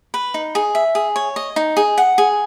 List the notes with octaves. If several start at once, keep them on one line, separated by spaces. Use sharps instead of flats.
B4
D#4
G#4
E5
G#4
C#5
D#5
D#4
G#4
F#5
G#4